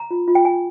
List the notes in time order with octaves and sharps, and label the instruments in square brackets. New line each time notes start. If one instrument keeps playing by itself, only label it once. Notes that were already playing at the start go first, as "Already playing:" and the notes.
Already playing: [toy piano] A#5
F4
F4
G5
F4 G#5